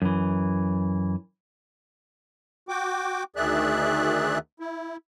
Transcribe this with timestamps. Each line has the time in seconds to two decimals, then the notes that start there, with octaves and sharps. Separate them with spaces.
0.02 F#2 E3
2.69 F#4 G5 D6
3.36 D2 D#3 G#4 D5 E5 F#6
4.60 E4